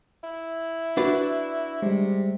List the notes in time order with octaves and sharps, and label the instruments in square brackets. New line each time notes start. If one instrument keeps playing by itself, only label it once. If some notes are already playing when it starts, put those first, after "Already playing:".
[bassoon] E4
[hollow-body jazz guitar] D4 B4 D5 [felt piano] F#4
[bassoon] C3 [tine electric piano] G3 G#3